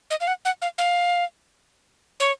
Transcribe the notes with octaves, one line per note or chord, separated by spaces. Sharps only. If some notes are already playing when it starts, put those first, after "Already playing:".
D#5
F5
F#5
F#5
F5
F5
C#5